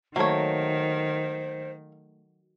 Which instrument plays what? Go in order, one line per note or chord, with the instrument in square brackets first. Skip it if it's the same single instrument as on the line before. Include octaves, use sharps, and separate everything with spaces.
[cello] D#3 [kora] F#3 A3 [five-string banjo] A#3 C#5 [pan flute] C5